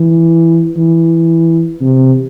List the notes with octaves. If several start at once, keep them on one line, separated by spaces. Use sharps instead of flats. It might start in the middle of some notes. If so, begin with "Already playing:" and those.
Already playing: E3
E3
C3